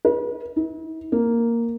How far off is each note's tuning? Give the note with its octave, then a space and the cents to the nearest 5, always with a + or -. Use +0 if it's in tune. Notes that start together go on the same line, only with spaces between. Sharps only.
B4 -40
E4 -45
A#3 -5